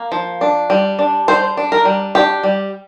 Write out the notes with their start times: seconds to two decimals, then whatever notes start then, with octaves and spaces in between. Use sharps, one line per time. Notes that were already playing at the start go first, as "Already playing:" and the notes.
Already playing: A#3
0.12 F3
0.41 D4
0.70 G3
0.99 D4
1.28 G3 C5
1.57 D4
1.72 A#4
1.85 G3
2.15 D4 G4
2.43 G3